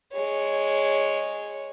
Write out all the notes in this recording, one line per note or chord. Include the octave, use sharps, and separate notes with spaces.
G#3 C#5